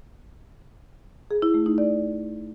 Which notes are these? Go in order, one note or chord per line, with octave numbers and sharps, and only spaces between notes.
G#4
E4
A3
D#4
D5